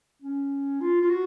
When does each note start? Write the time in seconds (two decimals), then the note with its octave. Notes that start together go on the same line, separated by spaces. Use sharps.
0.22 C#4
0.81 F4
1.01 F4
1.09 F#4